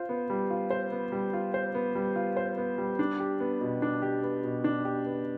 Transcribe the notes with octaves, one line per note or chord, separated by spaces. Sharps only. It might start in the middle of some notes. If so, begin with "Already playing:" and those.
Already playing: F4 C5
B3
G3
F4
C5
B3
G3
F4
C5
B3
G3
F4
C5
B3
G3
D4
G4
B3
B2
D4
G4
B3
B2
D4
G4
B3